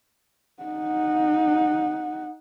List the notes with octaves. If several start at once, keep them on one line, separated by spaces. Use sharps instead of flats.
D#4 F#5